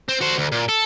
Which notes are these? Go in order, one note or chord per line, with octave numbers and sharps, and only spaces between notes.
C4
F#4 C5
D2
A#2
A4